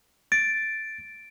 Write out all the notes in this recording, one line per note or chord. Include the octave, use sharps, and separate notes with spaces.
A6 D7